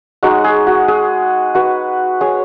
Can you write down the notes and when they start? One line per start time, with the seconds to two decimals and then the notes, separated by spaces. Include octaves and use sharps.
0.23 G#3 D#4 F#4
0.44 G#4
0.67 F#4
0.88 G#4
1.55 F#4 B4
2.21 G#4 C#5